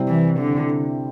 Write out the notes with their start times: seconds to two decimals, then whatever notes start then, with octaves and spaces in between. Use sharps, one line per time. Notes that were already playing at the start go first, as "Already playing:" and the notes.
Already playing: C3 G3 C4 E4
0.08 E3
0.39 D3